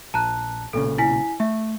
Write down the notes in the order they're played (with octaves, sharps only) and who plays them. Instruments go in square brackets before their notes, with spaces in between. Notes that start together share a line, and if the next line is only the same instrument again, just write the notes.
[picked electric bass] A#1 [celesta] A5 A#5 F#6
[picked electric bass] B1 A#2 C#3 [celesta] A4
[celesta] E4 G#5 B6
[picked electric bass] A3 [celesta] E5